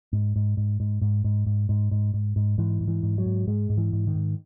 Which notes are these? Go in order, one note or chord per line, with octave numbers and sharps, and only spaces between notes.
G#2
G#2
G#2
G#2
G#2
G#2
G#2
G#2
G#2
G#2
G#2
G#2 E3
G#2
E3
G#2
F#3
G#2
G#2 G#3
G#2
E3
G#2
D#3
G#2